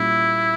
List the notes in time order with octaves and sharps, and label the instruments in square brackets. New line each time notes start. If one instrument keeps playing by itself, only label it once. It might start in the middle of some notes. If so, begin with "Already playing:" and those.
Already playing: [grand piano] A#2 G3 A#3 C#4 [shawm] E4